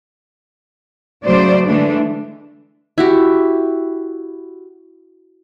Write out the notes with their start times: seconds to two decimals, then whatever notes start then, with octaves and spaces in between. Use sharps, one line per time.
1.26 C#3 F#3 A3 C5 D5
1.66 D3 E3 G#3 A3 D4
2.98 E4 F#4 G4